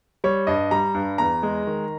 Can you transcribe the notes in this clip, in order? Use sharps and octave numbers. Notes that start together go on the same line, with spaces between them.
G3 C#5
G2 D#5
G3 A#5
G2
E2 A#5
G#3
D#3